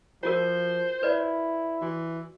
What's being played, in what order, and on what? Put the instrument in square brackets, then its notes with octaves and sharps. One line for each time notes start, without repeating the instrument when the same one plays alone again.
[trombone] F3 [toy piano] F4 F#4 A#4 [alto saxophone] C5
[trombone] E4 [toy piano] B4 D5
[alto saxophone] E3 [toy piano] F#4